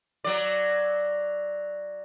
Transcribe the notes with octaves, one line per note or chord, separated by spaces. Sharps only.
F#3 D5